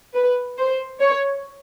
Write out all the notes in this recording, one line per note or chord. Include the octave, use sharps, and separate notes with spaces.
B4
C5
C#5